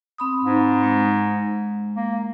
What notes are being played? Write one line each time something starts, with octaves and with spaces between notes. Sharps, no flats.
C4 B5 D#6
G#2
G#3
A#3